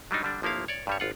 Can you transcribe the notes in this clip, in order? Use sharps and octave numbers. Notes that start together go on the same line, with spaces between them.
F#3 G3 D4 D#4
D3 G3 D4
G1 F3 A#3 E4 F5
C#5 D5
G2 G3 C#5
G#1 F4 F#5